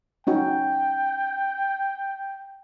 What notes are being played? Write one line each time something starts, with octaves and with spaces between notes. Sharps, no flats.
C#4 D#4 F#4 G5